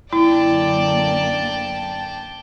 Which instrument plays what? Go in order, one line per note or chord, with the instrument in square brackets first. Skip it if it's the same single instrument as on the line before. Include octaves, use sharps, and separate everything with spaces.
[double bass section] F#2 D3 A#3 [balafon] E4 [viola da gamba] D5 [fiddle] G5 A5